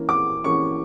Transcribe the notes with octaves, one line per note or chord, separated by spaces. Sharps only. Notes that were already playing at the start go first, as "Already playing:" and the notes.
Already playing: E3 A#3 C#4
D6
E3 A#3 C#4 C#6